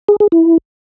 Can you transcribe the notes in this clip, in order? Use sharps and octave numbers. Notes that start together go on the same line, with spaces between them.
G#4
G#4
E4